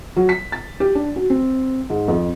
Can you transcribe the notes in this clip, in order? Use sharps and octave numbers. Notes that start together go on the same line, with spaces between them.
F#3
B6
A6
G4
D4
F#4
C4
G#2
F2